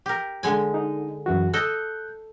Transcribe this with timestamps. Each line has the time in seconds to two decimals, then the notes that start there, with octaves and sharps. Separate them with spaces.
0.06 G4 A#4
0.43 D3 G#3 G#5
0.74 D#4
1.26 F#2 E3 F#4
1.54 A4 D#5 F#6 G6